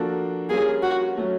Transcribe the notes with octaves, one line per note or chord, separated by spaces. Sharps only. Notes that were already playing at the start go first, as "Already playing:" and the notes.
Already playing: F3 A#3 D4 F#4 A4
G3 A#3 C#4 F4 G#4
F#4
F#3 A3 C#4